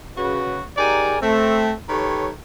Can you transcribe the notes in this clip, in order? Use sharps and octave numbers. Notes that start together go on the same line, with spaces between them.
C#3 F#4 B4
D#4 G4 G#4 A#4 D5 G#5
A3 C4
D#3 G4 A4 B4 C#5